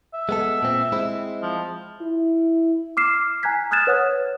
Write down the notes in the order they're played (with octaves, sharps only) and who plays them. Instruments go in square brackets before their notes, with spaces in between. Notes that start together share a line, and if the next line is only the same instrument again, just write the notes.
[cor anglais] E5
[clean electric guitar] G#3 B3 A4
A#2 C4
G#3 C4 E4
[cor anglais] F3
[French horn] E4
[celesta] D6 F6 C7 E7
G#5 A#5 F#6 G#6 B6
D#6 F6 F#6 G#6 A6 E7
B4 C#5 F#5 D#6 F#6